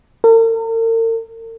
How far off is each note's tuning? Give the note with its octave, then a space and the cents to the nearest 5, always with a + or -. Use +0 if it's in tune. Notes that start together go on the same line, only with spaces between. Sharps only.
A#4 -45